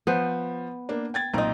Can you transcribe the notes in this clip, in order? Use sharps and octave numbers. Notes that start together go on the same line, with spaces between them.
F3 B3 B4 C5
A#3 D4
G5 G#6 A6
B1 A#2 C4 D#4 A#5